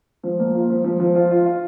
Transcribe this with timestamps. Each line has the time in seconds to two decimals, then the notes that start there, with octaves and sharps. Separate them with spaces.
0.23 F3
0.39 A#3
0.54 F4
0.70 F3
0.84 F3
1.00 F3
1.15 F4
1.31 F4
1.46 F4